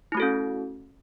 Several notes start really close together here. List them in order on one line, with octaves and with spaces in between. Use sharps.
E4 A3 F#4 A4 C#4